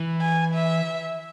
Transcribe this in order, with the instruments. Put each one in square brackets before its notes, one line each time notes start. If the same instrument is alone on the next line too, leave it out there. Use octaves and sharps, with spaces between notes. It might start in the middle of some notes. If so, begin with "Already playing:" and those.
Already playing: [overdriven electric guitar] E3
[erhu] G#5
E5